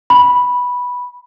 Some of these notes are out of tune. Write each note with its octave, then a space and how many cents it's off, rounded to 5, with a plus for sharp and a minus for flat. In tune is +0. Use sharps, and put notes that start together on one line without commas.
B5 -5